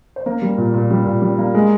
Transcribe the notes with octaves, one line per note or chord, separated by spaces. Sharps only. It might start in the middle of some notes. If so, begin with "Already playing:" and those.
C5
A#3 A#4
G3
A#2
A#2
G3
A#2
G3
A#3
G#3